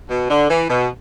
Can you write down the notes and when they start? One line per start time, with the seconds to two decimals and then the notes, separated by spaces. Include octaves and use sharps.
0.09 B2
0.29 D3
0.49 E3
0.69 B2